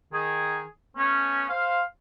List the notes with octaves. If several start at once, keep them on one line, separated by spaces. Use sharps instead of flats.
D#3 G#4
A3 B3 C#4
C5 F5